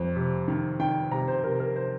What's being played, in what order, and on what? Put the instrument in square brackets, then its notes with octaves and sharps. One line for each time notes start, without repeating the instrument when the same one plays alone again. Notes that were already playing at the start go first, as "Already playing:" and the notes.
Already playing: [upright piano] F2
C3
D#3
D#3 G5
C3 A#5
C5
C3 A#4
A#4
C5